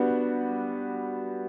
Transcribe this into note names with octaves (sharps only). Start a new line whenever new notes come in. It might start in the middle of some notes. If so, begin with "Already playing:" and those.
Already playing: G3 B3 D4 F#4